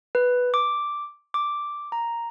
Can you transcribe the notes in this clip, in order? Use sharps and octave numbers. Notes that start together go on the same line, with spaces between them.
B4
D6
D6
A#5